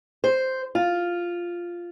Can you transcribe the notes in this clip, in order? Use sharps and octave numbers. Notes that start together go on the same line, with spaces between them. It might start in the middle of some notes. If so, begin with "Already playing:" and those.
C5
F4